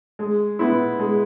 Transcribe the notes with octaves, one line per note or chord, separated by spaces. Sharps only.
G#3
B3 E4
G#3